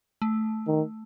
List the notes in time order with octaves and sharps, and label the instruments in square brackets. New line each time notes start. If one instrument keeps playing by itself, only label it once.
[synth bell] A3
[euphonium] D#3